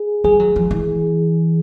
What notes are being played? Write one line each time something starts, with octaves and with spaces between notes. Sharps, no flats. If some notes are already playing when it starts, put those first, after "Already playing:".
Already playing: G#4
G3 G#4
F#3
F3
E3